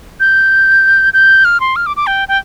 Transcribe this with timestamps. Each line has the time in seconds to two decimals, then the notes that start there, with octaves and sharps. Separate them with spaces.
0.20 G6
1.13 G6
1.45 F6
1.60 C6
1.76 F6
1.86 D6
1.97 D6
2.07 G5
2.28 G5